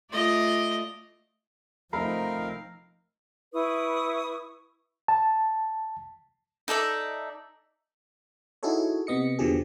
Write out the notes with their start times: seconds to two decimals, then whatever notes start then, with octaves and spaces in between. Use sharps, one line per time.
0.11 A3 F4 D5 D#5
1.93 F3 A3 C4 D#4 A#4 F5 A#5 B5
3.53 E4 B4 C#6 D#6
5.08 A5
6.68 D#4 A4 D5 E5
8.63 D#4 E4 F#4 G#4 A4 C#5
9.07 C3 B3 D#5 C#7
9.39 E2 B2 D3 F3 G4 G#4